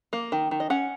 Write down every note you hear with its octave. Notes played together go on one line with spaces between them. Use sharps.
A#3
D#3
D#3
D#5
C#4 F#5